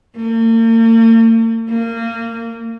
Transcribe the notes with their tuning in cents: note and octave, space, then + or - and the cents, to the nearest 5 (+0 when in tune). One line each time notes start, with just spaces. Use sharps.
A#3 -45
A#3 -25